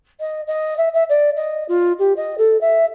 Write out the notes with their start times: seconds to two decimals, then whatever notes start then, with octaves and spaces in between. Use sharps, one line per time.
0.20 D#5
0.47 D#5
0.77 E5
0.94 E5
1.09 D5
1.36 D#5
1.68 F4
1.99 G4
2.16 D#5
2.38 A4
2.61 E5